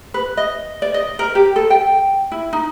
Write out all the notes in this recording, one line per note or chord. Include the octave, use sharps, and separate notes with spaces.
B4
D#5
D5
D#5
A#4
G4
A4
G5
E4
D#4